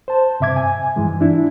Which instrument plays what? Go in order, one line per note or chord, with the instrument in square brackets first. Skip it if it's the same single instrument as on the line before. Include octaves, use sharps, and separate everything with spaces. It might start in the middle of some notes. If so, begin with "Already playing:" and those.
[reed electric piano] C5 A5
G2 C3 E5 D6 G#6
G#5
G2 E3 G#3
D4 E4